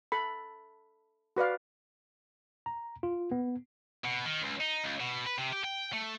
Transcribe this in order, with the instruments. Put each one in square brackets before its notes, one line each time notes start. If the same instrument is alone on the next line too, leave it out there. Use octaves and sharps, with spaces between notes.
[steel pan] A4 B5
F#4 B4 D5 F5
[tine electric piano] A#5
F4
B3
[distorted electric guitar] B2
D#3
C#2
D#4
C#2
B2
B4
C3
G4
G5
A3